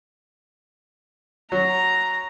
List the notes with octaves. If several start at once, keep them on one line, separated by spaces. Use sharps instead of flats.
F#3 A#5